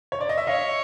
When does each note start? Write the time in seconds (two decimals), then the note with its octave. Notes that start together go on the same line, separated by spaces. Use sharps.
0.12 C#5
0.21 D5
0.29 D#5
0.38 E5
0.47 C#5 D#5 F5